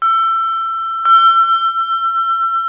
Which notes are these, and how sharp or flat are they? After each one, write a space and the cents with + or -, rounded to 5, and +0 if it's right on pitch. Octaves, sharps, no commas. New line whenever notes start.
E6 +25
E6 +35